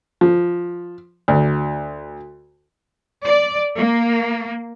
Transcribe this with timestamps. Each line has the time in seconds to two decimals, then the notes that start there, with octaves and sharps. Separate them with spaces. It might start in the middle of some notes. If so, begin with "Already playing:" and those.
0.21 F3
1.28 D2
3.24 D5
3.78 A#3